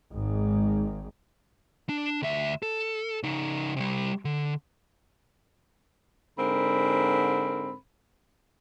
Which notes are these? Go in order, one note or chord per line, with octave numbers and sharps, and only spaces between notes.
G#1 G#2
D4
D2 E5
A4
C#3 D#4
C3 G3
D3
G#2 D3 C4 A#4 B5